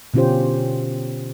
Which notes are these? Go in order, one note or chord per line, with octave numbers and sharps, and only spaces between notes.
B2 D3 C#4 F4 G4 C5